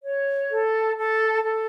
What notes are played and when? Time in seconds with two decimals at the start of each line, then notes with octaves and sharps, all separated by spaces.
0.03 C#5
0.51 A4
0.97 A4
1.45 A4